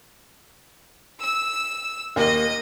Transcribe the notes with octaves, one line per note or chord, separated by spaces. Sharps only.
E6
D#2 A#3 D#5